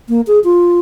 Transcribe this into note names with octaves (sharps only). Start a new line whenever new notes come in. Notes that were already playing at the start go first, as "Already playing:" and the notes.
A#3
G#4
F4